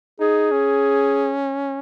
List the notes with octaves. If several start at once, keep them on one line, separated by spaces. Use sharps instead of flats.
D#4 G#4
C#4